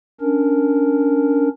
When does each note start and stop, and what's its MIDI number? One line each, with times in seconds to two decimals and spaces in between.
0.21 1.48 61
0.21 1.48 62
0.21 1.48 70